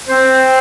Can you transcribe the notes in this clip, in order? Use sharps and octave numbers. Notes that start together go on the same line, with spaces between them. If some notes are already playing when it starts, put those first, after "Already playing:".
C4 C5